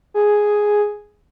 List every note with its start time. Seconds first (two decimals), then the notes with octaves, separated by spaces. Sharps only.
0.14 G#4